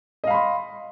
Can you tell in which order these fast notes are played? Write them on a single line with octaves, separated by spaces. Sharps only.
D#5 F5 B5 C6